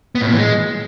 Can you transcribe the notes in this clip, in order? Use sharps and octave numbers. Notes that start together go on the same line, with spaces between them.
B3
A2
A#2
E3
G#3